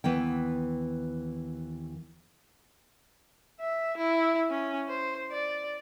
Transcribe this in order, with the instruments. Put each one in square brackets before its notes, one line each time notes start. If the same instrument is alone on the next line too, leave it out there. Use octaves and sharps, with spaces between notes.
[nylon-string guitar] D#2 E3 B3 G5
[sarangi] E5
E4
C#4
C5
D5